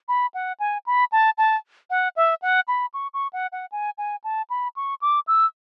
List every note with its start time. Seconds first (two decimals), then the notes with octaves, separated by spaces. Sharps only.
0.08 B5
0.34 F#5
0.60 G#5
0.86 B5
1.12 A5
1.38 A5
1.90 F#5
2.16 E5
2.42 F#5
2.68 B5
2.94 C#6
3.14 C#6
3.33 F#5
3.52 F#5
3.72 G#5
3.98 G#5
4.24 A5
4.50 B5
4.76 C#6
5.01 D6
5.27 E6